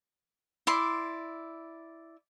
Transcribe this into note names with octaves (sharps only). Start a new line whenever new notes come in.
E4 D5 C6